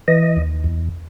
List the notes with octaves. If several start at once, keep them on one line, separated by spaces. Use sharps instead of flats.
E3 D#5
D#2
E2